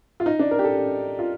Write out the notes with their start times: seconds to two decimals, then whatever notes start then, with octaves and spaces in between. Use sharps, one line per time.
0.20 F4
0.26 D#4
0.39 D4
0.51 A#4
0.59 G4
0.64 A4
1.19 F4